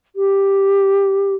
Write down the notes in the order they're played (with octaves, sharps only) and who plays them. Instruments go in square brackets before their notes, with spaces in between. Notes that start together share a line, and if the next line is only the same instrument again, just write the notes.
[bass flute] G4